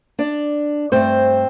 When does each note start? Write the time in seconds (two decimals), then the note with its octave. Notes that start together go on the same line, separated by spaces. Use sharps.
0.19 D4 D5
0.92 G2 D3 A3 C4 C5